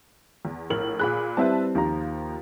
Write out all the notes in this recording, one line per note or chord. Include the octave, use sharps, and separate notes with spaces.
E2
A#1 A2 A#4 F#7
A#2 G#4 B5 F#6
G3 C4 E4 B4 E5 A5
D#2 F3 A#5